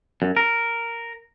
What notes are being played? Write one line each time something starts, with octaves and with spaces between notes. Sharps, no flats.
F#2
A#4